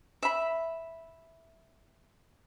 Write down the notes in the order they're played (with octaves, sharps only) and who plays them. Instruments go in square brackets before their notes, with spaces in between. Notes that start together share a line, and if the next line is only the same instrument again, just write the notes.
[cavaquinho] E5 B5